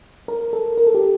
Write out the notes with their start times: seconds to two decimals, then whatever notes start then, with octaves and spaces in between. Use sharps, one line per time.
0.28 A#4
0.53 A4
0.78 A#4
0.87 A4
0.95 G4